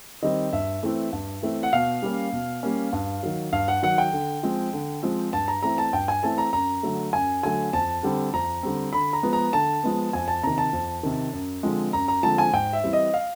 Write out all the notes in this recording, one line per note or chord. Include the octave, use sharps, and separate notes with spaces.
D#3 G3 C4 D#5
G2 E5
E3 A3 C4
G2
E3 A3 C4
F#5
B2 F5
G3 A#3 C#4
B2
G3 A#3 C#4
G2
D#3 F#3
G2 F5
F#5
D#3 F#3 F#5
G5
D3
F3 G#3 C4
D3
F3 G#3 C4
G2 A5
A#5
E3 A3 C4 A#5
A5
G2 G5
G#5
E3 A3 C4 A5
A#5
F#2 A#5
D3 F#3 A3
F#2 G#5
D3 F#3 A3 G#5
F2 A5
D3 G3 C4
F2 A#5
D3 G3 C4
D3 B5
A#5
F3 G#3 B3
A#5
D3 A5
F3 G#3 B3
F2 G#5
A5
C3 D#3 A#5
A5
F2
C3 D#3
F#2
D3 F3 G#3 C4
F#2 A#5
A#5
D3 F3 G#3 C4 A5
G#5
G#2 G5
E5
E3 G3 C4
D#5
F5